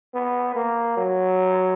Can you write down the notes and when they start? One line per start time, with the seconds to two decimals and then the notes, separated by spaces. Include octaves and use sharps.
0.14 B3
0.56 A#3
0.97 F#3